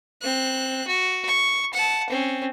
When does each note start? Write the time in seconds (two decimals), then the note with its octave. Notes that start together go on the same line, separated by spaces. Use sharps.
0.22 C4 F#6
0.87 F#4
1.28 C#6
1.73 F#5 A5
2.09 C4 C#4